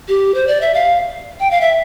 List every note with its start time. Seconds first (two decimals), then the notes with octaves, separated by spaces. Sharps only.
0.08 G4
0.34 C5
0.47 D5
0.61 E5
0.74 F5
1.40 G5
1.51 F5
1.61 E5